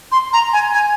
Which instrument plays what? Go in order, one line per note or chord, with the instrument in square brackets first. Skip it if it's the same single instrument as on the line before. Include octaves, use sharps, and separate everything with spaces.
[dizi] C6
A#5
G#5
G#5